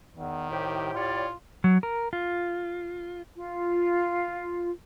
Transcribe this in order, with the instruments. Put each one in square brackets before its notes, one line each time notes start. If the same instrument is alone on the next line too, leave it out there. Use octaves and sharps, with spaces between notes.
[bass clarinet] E2 [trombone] D#3
[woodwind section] C2 G4 [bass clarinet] A2
[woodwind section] G3 C#5 D5 [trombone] F4
[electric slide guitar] F#3
A#4
F4
[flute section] F4